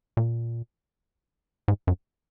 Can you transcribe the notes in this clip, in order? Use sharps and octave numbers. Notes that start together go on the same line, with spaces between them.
A#2
G#2
F#2